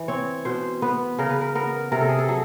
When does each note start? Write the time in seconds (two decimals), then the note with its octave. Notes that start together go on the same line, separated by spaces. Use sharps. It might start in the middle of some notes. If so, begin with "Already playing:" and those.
Already playing: E3
0.08 C4 C#5
0.45 B2 C5
0.82 B3 B4
1.18 C#3 A#4
1.30 B4
1.41 A#4
1.55 B3 A#4
1.92 C3 A#4
2.01 A4
2.09 G#4
2.19 A4
2.28 F#3 G#4